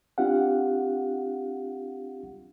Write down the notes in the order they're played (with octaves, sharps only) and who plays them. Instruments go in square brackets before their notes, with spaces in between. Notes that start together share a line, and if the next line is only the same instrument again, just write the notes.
[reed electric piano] C4 D4 F4 G4 F5 F#5